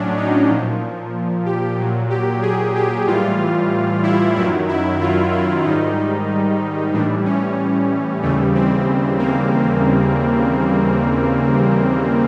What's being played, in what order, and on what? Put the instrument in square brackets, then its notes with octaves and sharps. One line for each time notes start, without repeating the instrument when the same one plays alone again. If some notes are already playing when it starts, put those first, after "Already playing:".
Already playing: [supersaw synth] A2 F#3 C#4 D4
D#4
A#2 F3
G4
A#2 F#3
G4
G#4
G4
A2 E3 G3 F4
E4
F#2 D#3 F#3 E4
E4
F4
E4
G#2 D#3 G3 D#4
A2 E3 G3 D4
C#4
D#2 C#3 E3 G3 A3
C4
A#3